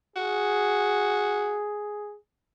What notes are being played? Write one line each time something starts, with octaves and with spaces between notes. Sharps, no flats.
F#4 G#4